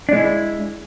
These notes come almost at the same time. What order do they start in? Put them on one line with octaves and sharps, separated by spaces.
D4 G#3 E4